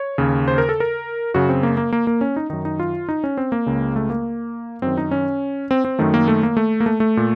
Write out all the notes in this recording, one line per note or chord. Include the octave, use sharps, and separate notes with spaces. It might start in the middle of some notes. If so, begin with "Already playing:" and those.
Already playing: C#5
D#2 C#3
C5
A#4
A4
A#4
F#2 C#3 F#4
C4
A#3
A#3
A#3
A#3
C#4
D#4
F#2 D#3 D#4
D#4
F4
D#4
C#4
C4
A#3
C#2 C#3
A3
A#3
F#2 D#3 C4
D#4
C#4
C4
C4
F#2 D#3 A3
A#3
A3
A#3
A3
A#3
A3
A3
A#2